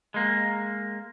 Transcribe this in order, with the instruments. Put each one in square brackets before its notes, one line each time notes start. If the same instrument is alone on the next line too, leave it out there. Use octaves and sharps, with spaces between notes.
[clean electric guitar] G#3 A#3